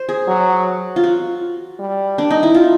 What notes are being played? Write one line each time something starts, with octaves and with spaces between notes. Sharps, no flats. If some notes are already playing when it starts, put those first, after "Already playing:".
Already playing: C5
G#4
F#3
F4
F#4
G3
D4
D#4
E4
F4